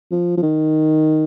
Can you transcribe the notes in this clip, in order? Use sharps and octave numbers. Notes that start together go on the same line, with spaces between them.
F3
F3
D#3